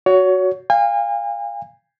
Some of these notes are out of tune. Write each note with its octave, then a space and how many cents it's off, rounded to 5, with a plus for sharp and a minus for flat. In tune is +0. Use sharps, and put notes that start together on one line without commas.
F#4 +0 C#5 +25
F5 +0 G#5 -40